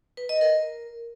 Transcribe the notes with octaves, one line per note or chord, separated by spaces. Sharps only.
B4
D#5
A#4